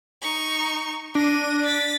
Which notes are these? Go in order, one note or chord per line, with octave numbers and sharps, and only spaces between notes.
D#4 C#6
D4 A#6 D#7
A6 B6